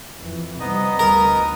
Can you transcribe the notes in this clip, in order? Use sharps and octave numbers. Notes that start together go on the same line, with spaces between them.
F2 E3
C3 G3 B3 D#4 D#5
D2 A#4